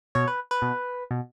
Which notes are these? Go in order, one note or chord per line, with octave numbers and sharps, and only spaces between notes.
B2 C#5
B4
B4
B2
B2